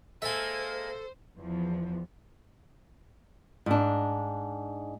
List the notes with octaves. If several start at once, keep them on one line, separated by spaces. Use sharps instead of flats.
G#3 A#3 A4 C5 E5 G#5
E2 F3
G#2 D4